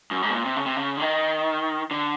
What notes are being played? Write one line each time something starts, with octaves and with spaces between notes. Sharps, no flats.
F#2
G#2
B2
A#2
C3
C#3
C3
C#3
D3
D#3
D3